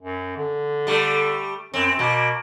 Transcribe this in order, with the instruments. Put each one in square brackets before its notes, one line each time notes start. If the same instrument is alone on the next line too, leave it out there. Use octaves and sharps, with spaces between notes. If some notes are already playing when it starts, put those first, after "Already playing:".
[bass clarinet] F#2
D3
[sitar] G3 A3
[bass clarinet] F#2 [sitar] C4
[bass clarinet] B2 [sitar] A#3